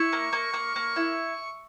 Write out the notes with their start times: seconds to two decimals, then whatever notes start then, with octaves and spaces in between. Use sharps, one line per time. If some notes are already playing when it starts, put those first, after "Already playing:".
Already playing: E4 C#6
0.13 A#3
0.33 A#3
0.53 A#3
0.76 A#3
0.96 E4